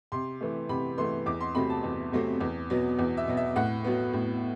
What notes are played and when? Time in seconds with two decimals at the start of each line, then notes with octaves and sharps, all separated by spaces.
0.12 C3 C6
0.41 E3 A3
0.69 C3 B5
0.98 E3 A3 C6
1.26 E2 D6
1.41 C6
1.55 C3 F#3 A3 C4 B5
1.70 A5
1.84 E2
2.12 C3 F#3 A3 C4
2.41 E2
2.70 B2 F#3 B3
2.99 E2
3.17 E5
3.27 B2 F#3 B3
3.37 E5
3.56 A2 F#5
3.84 F#3 B3
4.13 A2